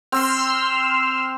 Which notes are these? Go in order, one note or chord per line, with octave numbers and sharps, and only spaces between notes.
C4 C6 E6 F6